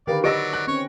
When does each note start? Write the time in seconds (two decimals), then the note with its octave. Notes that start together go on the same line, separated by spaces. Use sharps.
0.07 D3 D#3 G4 A#4 B4 D5 F5
0.24 F#3 G4 D5 D#5 E6 A#6 D7
0.53 F#6
0.67 C4 C#4 C#5 C#6